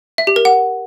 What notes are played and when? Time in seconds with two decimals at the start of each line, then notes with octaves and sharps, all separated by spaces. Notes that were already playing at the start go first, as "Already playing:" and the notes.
0.18 E5
0.27 G4
0.36 A#4
0.45 F#5